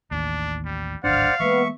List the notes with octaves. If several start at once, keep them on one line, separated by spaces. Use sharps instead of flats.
A1 D#2 D4
G3
D1 G#1 D4 C5 D5 F5 F#5 F6
E3 G#3 A#3 B3 E5 C#6